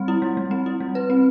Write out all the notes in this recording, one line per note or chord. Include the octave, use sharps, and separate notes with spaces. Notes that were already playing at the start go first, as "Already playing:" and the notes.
Already playing: G3 C4
E4
G3
G3
C4
E4
G3
B4
C4